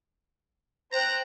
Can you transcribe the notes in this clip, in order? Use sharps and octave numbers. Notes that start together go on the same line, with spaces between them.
C5 G5 A#5 F#6